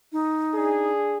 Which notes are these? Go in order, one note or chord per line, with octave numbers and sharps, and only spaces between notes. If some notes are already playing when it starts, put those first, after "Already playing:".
D#4
D4 G#4